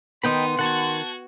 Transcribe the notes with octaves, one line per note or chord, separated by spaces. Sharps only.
D#3 B3 D#4 D#5 G5 B5 C6
D#3 F#4 F#5 A5 G#6